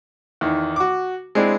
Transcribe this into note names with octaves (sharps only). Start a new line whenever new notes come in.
E2 D#3
F#4 D6
G#3 C4 D4 E4